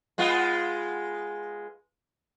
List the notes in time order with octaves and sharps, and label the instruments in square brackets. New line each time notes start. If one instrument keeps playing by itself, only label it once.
[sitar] G#3 B3 F4